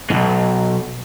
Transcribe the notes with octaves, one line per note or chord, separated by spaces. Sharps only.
B1 G#2